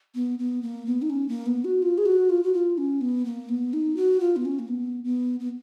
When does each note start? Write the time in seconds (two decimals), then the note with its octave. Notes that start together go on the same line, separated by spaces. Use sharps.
0.15 B3
0.39 B3
0.62 A#3
0.87 B3
1.02 D#4
1.10 C#4
1.29 A#3
1.46 B3
1.65 F#4
1.82 F4
1.98 G#4
2.06 F#4
2.30 F4
2.43 F#4
2.54 F4
2.78 C#4
3.01 B3
3.25 A#3
3.49 B3
3.73 D#4
3.97 F#4
4.20 F4
4.36 B3
4.45 C#4
4.59 A#3
4.68 B3
5.04 B3
5.40 B3